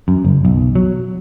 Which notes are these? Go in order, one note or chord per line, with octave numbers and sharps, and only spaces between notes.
F#2
F#1
B1
F#3